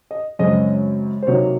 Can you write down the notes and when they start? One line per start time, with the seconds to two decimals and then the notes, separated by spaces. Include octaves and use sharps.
0.11 D#5
0.39 F#2 C#3 G#3 C4 D#5
1.23 C5
1.27 C3 F#3 A#3 D#4 C#5